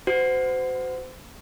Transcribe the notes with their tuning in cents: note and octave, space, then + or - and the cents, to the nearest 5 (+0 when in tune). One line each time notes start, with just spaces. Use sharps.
F#4 +0 C5 -30